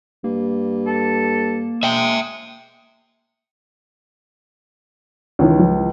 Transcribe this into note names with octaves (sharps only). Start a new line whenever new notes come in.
G2 A#3
A4
G#3 E5 G5
C#2 D#3 E3 C#4
F3